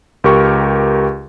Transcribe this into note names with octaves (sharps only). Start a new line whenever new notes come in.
C#2 G4 A#4 C#6